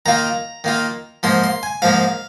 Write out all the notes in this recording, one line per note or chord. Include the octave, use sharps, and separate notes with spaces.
D#3 A#3 F4 A#5
D#3 A#3 F4
G#2 F3 A#3 C6
C6
G#5
G#2 F3 A#3 F5